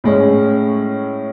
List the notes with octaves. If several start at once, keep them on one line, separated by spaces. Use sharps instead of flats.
A2 G#3 C#4